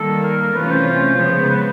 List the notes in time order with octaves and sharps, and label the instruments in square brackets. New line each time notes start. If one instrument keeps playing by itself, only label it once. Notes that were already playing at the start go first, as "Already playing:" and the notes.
Already playing: [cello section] D#3 G3 A#3 [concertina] A4
[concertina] A#4
[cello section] C3 E3 A3 C#4 F4 [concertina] B4
[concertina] C5
[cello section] C#3 F3 G#3 B3
[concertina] B4